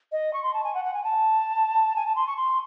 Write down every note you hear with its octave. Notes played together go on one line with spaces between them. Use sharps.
D#5
C#6
C6
A5
G#5
F#5
F#5
G#5
A5
G#5
A5
C6
C#6
C6